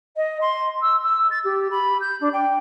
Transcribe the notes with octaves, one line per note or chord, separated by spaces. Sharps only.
D#5
C6
E6
E6
A6
G4
B5
G6
D4
G5